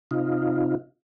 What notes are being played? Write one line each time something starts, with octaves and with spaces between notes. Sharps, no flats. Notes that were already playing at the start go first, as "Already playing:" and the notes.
C3 D#4 F4